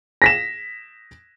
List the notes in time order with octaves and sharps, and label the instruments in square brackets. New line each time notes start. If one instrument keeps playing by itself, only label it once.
[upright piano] A#6 B6 E7